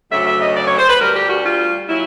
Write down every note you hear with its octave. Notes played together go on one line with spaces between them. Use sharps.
D2 C#3 F#3 A3 E5
E5
D#5
D5
C#5
C5
B4
D2 D3 G3 A#4
G4
F#4
F4
A#2 F#3 E4